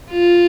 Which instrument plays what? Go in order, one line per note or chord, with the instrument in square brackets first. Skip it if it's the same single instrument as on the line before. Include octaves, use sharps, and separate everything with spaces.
[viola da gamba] F4